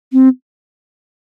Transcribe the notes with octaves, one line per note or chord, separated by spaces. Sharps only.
C4